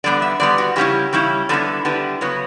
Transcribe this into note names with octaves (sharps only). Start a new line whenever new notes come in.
D3 G3 B3 D5
E5
D3 G3 B3 D5
F#4
C#3 G3 C#4 E4 G4
C#3 G3 C#4 E4
D3 G3 B3 E4 A4
D3 G3 B3 E4
C#3 F#3 B3 C#5